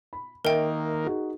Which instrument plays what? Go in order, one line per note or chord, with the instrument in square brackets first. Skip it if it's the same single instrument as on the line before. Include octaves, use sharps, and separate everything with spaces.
[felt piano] B5
[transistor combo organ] D#3 A#3 [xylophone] A#4 G5 [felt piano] D#5 E5
[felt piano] D#4 F#4 G#4